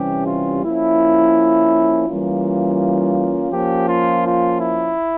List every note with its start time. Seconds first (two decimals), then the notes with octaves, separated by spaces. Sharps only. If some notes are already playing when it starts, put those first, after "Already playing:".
Already playing: C3 E3 G3 C#4 G4
0.27 F4
0.64 F3 A#3 C#4 E4
2.07 E3 G3 A#3 C#4 F4
3.52 F3 A#3 C#4 G4
3.88 F4
4.25 F4
4.60 E4